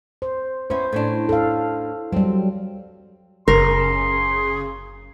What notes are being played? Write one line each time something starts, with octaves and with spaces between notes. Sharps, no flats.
C5
B3 C#4 E4 C5
A2 C#4 D4
A4 F5
F#3 G3 C4
F#1 C#3 A#4 C6